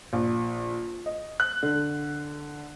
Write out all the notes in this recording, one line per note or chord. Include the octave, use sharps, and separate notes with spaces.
A#1
D#5
F#6
D3